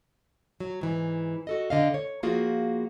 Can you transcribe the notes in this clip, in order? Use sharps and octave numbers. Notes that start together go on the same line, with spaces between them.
F#3
G#2 E3
F#4 A4 D#5
D3 D#5 F5
C#5
F3 A#3 F4 F#4 G#4